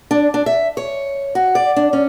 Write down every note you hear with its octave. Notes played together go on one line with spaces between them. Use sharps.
D4
D4
E5
C#5
F#4
D5
D4
C#4